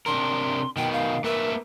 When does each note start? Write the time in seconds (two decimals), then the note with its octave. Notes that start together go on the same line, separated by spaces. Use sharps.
0.06 C3 D4 A#4 C6
0.77 B2 D#3 G5
0.92 F5
1.24 A#3 A#4 B4 E5